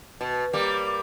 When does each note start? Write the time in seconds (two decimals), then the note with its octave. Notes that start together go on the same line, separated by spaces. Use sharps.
0.21 B2
0.53 G3 A#3